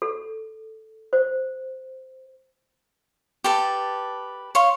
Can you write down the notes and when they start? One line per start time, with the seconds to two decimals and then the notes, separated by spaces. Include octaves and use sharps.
0.02 A4
1.13 C5
3.44 G4 A4 B4 A5
4.55 C#5 F5 C6